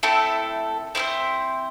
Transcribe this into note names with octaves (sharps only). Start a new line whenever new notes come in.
A3 C4 E4 A4
C4 E4 A4 C5